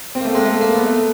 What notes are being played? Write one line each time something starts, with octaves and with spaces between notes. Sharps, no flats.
C4
A#3
A3
G#3
A3
A#3
B3
A3